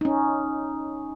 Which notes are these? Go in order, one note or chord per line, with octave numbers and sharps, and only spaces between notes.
C#4 D#4